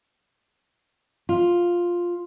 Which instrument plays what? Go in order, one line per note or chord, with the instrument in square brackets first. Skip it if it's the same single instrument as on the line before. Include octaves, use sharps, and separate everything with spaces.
[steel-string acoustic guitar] F4